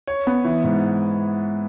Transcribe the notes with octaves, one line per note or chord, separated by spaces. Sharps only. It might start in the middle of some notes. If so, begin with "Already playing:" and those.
C#5
B3
E3
G#2